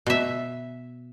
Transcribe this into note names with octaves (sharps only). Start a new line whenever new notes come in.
B2 E5